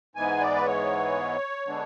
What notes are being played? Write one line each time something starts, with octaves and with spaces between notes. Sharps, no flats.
G#2 E3 G#3 B3 G#5
D5
B4
C#5
D3 G#3 B3 D4